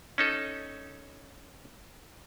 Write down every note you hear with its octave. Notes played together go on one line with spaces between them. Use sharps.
C#4 D#4 A4